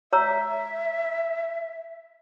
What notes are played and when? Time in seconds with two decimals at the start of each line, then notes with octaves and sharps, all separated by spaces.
0.13 C#5 E5 A#5 E6